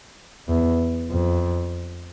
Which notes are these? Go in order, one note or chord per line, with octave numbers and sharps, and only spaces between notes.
E2
F2